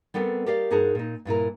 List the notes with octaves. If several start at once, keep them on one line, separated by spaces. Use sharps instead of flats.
G3 B3 C4 A4 A#4
G4 A#4 D5 D#5 F5
G2 D#4 G#4 A#4 F#5 A5
A#2 D#4
G2 A#2 E4 A#4